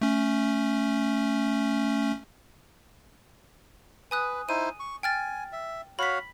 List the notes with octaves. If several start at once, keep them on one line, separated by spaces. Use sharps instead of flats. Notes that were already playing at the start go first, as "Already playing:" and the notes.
A3 C#4
B4 G#5 D#6 F#6
D#4 E4 C5 D#7
C#6
G5 G#5 F6 A6
E5
F#4 C#5 F5 B5 B6